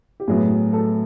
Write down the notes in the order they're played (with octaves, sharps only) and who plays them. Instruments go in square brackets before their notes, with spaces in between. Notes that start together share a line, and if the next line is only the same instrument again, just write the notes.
[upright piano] G4
A2 F#3 B3 G#4
A4